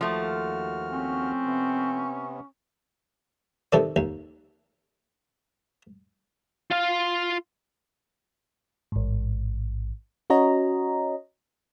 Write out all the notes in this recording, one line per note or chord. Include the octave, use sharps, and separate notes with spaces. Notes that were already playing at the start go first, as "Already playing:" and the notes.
D#2 F3 A3 F#4 F6
C4 C#4
C3 B3
C3 D#3 A4 D5
D#2
F4 F5
A1 G#2
C#4 F#4 C#5 D#5 A#5